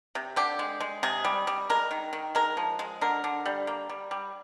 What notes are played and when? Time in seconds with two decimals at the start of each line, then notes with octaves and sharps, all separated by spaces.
0.15 C3
0.36 D3 G4
0.59 G#3
0.80 G#3
1.03 C3 G#4
1.25 G3
1.47 G3
1.70 G#3 A#4
1.91 D#3
2.13 D#3
2.35 G#3 A#4
2.57 F3
2.79 G#3
3.01 D3 A#4
3.24 D3
3.46 G3
3.67 A#3
3.89 G3
4.11 G3